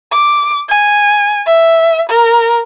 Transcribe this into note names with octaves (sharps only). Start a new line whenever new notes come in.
D6
G#5
E5
A#4